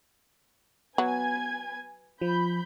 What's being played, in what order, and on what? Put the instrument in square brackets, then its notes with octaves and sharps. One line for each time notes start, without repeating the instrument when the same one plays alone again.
[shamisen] F#3 [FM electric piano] B3 [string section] B4 G#5 G#6
[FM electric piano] F3 [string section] B5 G6